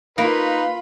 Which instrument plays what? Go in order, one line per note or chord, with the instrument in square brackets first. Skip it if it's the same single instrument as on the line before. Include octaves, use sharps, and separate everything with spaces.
[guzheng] A#3 [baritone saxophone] D#4 [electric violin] F4 B5 [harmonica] B4